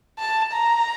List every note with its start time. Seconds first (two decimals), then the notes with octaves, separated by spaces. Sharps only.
0.19 A5
0.52 A#5